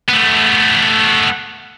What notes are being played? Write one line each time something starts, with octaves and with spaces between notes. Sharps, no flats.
A3 B3